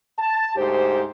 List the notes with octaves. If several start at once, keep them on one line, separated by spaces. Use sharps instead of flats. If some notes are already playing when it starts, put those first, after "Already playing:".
A5
D2 G#2 G4 C5